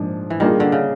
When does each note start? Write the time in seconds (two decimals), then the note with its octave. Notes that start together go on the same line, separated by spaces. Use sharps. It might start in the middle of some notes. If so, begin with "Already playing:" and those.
Already playing: G#2 F3 A#3 D4
0.30 E3
0.40 D#3 G3 A#3 D4 F4 G#4
0.60 D3
0.72 C#3